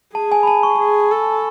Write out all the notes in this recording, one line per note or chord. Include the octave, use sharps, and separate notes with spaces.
G#4 A5
G#5
B5
A5
C#6
G#4
A4